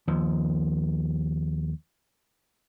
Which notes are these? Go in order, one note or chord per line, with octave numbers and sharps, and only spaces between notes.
D#2 F3